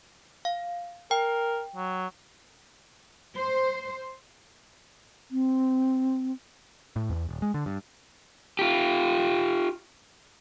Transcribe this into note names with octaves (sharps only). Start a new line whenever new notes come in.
F5
A#4 G5
F#3
C5
C4
A2
E2
D#1
G#3
D3
G2
F4 G4